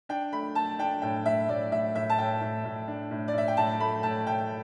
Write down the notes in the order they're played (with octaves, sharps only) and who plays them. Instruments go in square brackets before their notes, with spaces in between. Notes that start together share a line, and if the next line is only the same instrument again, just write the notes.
[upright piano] D4 G5
A3 B5
A3 A5
D4 G5
A2 G5
A2 E5
A2 D5
A2 E5
A2 E5
A5
A2 G5
A2
A2
D4
A2
D5
A2 E5
G5
A2 A5
A3 B5
A2 A5
A2 G5